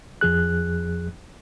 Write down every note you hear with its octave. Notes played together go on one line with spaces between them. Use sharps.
F2 F3 G#4 F#6